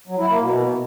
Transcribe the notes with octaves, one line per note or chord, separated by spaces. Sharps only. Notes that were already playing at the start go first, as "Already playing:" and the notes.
F#3
E4
A#3
B2